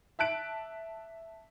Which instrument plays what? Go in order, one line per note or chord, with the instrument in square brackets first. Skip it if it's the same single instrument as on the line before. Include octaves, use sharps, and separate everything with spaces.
[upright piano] E5 A5 F#6 D7